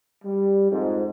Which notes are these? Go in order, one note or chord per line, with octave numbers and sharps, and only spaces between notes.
G3
F2 G#2